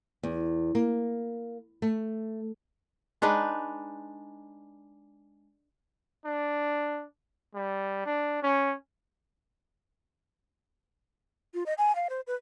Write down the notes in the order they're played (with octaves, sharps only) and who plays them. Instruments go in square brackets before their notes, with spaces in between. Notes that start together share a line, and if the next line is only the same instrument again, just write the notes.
[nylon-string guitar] E2
A#3
A3
[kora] G#3 D4 D#4 B4
[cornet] D4
G3
D4
C#4
[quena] F4
D#5
G#5
F5
C5
B4